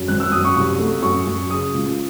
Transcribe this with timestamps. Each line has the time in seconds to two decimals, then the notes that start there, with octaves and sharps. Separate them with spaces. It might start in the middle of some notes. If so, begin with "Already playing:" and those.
Already playing: F#2
0.08 G#1 F#6
0.20 E6
0.32 F#2 D#6
0.44 C#6
0.55 C2 C#6
0.79 A3
1.03 F#2 C#6
1.27 F#2
1.50 C#3 D#6
1.74 C#2